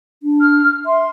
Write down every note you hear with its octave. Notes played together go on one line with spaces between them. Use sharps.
D4
F6
E5 C6